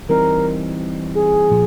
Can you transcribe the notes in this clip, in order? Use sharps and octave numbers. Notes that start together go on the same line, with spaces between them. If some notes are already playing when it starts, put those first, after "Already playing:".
E3 G3 C4 D#4 A#4
G#4
A#2 F3